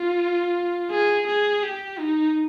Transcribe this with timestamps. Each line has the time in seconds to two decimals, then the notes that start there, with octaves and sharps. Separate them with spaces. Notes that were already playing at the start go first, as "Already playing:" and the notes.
Already playing: F4
0.91 G#4
1.27 G#4
1.63 G4
1.99 D#4